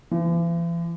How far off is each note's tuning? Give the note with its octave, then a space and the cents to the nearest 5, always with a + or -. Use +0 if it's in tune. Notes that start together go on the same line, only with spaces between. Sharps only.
E3 +45